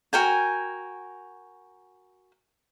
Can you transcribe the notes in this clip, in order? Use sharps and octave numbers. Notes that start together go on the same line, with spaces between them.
F#4 A#4 G5 G#5